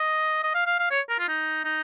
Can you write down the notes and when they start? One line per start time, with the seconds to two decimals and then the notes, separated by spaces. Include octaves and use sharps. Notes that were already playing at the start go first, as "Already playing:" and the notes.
Already playing: D#5
0.43 D#5
0.54 F5
0.66 F5
0.79 F5
0.91 C#5
1.09 A#4
1.19 F4
1.28 D#4
1.65 D#4